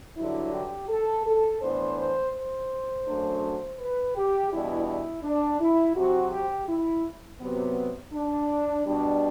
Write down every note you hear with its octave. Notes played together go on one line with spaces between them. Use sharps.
G2 D3 F#3 E4
G4
A4
A4
A2 E3 B3 D4 C5
C5
C5
F#2 F#3 A3 D4
B4
G4
E2 B2 G3 D4 E4
E4
D4
E4
C3 F#3 C4 F#4
G4
E4
C3 F#3 B3
D4
B2 G3 D4